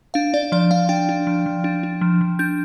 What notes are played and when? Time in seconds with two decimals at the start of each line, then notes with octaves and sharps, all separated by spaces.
0.14 D4 F5
0.34 D4 D5
0.52 F3 D5
0.71 F3 F5
0.89 D4 G5
1.09 D4
1.27 F3
1.46 F3
1.64 D4
1.83 D4
2.01 F3
2.21 F3
2.39 D4 G6